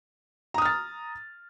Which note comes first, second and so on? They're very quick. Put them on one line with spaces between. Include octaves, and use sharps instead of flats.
A#5 D#6 F6 A6